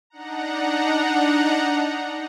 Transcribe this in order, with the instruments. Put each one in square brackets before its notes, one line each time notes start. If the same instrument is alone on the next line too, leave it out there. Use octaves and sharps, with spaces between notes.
[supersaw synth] D4 D#4 F#5 A#5